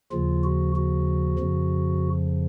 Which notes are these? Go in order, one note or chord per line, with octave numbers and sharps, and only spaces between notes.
D#2 C#3 F3 F4
F#4
F#4
F2 C#3 F3